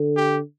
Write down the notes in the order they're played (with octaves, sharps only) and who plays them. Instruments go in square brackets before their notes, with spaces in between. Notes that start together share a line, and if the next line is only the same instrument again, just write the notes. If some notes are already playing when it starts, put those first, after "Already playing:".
Already playing: [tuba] D3
[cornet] G4